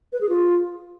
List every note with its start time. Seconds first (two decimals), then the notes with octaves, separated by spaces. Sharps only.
0.13 B4
0.21 G#4
0.29 F4